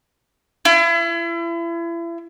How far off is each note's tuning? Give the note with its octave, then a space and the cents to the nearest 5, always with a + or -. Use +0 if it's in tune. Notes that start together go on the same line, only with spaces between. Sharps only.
E4 +35